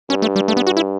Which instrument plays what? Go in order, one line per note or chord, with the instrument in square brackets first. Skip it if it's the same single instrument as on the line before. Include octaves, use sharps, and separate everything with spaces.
[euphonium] G2 [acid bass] C#4
[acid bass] A3
G3
A3
B3
F#4
E4